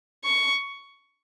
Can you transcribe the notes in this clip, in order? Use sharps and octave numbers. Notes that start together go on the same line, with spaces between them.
C#6